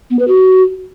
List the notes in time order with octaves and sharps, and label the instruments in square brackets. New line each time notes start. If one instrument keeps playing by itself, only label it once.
[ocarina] B3
B4
F#4